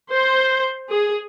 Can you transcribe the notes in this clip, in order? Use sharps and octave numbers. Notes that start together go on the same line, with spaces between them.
C5
G#4